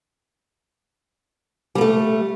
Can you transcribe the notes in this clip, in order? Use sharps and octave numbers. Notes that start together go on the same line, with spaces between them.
G3 A3 A#3